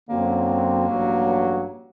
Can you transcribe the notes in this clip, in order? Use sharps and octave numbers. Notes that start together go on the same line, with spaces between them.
F#2 D3 F#3 A#3 C4
A1 G2 F#3